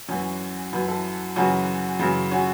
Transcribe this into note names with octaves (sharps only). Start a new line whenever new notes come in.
F#2 E3 C#4 F#4
F#2 E3 F#4 B4
E4 A4
F#2 C#3 E3 C#4 F#4
F#2 C#3 E3
C#4 F#4